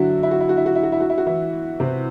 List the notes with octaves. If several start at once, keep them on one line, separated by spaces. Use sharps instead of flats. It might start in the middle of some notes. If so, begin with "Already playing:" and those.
Already playing: D3 F#3 D4 E4 F#4
E4
F#4
E4
F#4
E4
F#4
E4
F#4
E4
F#4
E4
F#4
E3 E4
C3 C4